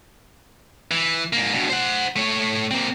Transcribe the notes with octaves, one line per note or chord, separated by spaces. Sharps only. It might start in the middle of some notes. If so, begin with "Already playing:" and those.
E3
G#2 A#3
G2 B2
C5 F#5
A3 C#5
A#3 C4